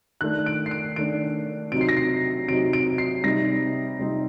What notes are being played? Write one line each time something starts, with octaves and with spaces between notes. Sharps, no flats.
D#3 A3 D4 F#6
D7
C7
D7
D#3 A3 D4 D7
C3 F#3 C4 D#4 D7
C7
A#6
C7
C3 F#3 C4 D#4 D7
D7
C7
C3 G3 C4 D#4 A#6
C3 G3 C4 D#4